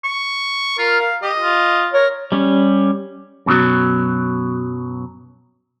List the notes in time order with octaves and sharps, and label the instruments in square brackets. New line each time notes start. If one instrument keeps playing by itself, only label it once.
[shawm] C#6
[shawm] F4 [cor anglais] A#4
[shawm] F5
[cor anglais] G4 [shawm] D#5
[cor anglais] F4
[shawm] A#4 [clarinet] C#5
[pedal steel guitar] G3 C#4
[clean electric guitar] F#2 B2 E3 F#3